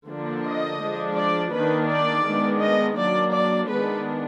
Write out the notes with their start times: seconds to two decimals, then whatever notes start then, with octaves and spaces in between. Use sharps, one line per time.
0.08 D3 F3 A#3 D4
0.45 D#5
0.81 F3 G#3 D4
1.17 D5
1.53 D#3 A#3 D4 B4
1.89 D5
2.26 D#3 G#3 B3 D4
2.61 D#5
2.97 F#3 A#3 D4 D5
3.34 D5
3.69 D#3 G#3 B3 D4 B4